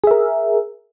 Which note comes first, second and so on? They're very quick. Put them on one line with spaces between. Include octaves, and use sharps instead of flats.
G#4 E5 A#4